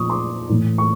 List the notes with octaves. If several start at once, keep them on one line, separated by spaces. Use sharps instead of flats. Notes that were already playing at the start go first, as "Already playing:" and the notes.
Already playing: A#2 F3 C#6 D#6
C6 D6
A2 E3
C#6